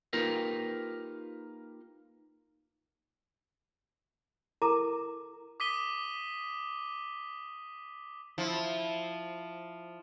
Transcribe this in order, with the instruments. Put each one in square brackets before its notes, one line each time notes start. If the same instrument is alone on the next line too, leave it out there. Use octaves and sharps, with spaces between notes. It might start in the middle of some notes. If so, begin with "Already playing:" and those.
[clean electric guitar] A#3 D#4 F4 G4 A#4 B4
[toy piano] E4 A4 A#4 A5 A#5 D6
[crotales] D6 D#6 B6 D#7 G7
[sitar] F3 [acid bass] E4